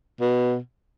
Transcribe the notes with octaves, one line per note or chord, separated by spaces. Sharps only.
B2